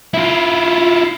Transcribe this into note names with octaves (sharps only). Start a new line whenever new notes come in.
E4 F4